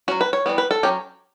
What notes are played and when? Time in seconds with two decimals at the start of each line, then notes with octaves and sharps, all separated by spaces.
0.08 F#3 C#4 F#4
0.21 B4
0.33 C#5
0.46 E3 G3 B3
0.58 B4
0.71 A4
0.83 F#3 C#4 G4